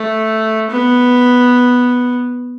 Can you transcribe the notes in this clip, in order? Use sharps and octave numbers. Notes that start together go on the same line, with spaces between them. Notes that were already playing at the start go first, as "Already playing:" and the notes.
Already playing: A3
B3